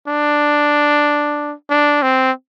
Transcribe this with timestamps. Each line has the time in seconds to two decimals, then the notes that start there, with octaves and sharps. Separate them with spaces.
0.08 D4
1.70 D4
2.03 C4